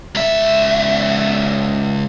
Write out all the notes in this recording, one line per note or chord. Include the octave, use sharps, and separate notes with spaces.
C#2 E5